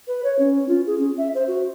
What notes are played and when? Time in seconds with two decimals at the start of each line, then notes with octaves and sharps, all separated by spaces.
0.08 B4
0.24 C#5
0.39 C#4
0.68 F4
0.87 G#4
0.99 C#4
1.18 E5
1.35 C5
1.48 F#4